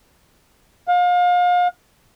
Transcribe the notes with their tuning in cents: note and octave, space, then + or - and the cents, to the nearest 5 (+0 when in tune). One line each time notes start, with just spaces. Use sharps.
F5 +35